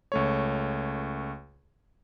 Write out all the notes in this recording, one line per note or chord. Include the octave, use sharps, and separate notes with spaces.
C#2 A3 C#5